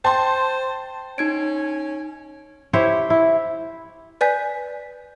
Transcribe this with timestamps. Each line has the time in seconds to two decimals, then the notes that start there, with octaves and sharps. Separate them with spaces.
0.05 C5 G5 A5 C6
1.18 C#4 D#4 G#6 D7
2.73 E4 G4 C5 C#5
3.10 E4
4.21 B4 D5 G#5 G6 B6